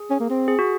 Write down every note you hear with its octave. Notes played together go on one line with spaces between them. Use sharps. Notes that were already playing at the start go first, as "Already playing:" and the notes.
Already playing: G#4
C#4
A#3
C4
G#4
F#4